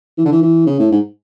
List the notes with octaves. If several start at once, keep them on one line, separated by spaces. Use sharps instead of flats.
E3
D3
E3
E3
C#3
A2
G#2